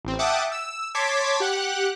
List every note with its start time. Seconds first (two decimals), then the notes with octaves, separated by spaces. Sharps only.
0.05 A1 C4
0.19 E5 F#5 G5 A5 D6 D#6
0.52 E6
0.95 C#5 A5 C6 D6 G#6 B6
1.40 G4 F#5 F#6